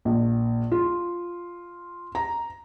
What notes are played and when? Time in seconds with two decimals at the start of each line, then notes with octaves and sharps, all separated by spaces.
0.05 A#1
0.72 F4
2.15 A#5